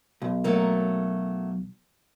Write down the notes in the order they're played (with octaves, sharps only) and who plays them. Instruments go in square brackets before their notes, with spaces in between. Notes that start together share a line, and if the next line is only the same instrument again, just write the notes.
[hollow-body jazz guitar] B1
[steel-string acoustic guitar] F#3 A3 A#3